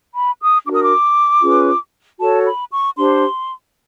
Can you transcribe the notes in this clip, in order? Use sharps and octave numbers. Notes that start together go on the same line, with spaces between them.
B5
D#6
D4 F#4 A#4 D6
D#6
D6
C#4 F4 G#4 B4
F#4 A4 C#5 A5
B5
C#6
D4 G4 C5 C6